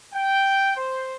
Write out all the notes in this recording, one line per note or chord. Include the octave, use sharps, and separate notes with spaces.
G5
C5